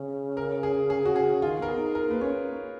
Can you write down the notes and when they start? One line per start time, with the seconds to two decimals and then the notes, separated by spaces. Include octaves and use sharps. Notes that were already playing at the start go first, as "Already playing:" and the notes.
Already playing: C#3
0.37 A#4
0.63 G#4
0.90 G#4
1.05 F#4
1.16 G#4
1.42 D#3 F4
1.60 B3 A#4
1.68 G#4
1.78 D#4
1.95 A#4
2.09 A#3 B4
2.21 C#4 C#5